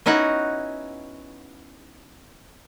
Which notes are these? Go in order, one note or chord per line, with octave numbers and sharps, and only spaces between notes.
B3 C#4 D#4 E4 F#4 F#5